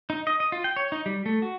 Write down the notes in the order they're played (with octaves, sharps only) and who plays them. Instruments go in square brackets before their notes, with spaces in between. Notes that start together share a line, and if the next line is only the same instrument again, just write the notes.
[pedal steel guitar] D#4
D#5
D#5
F4
G5
C#5
D#4
G3
A3
F#4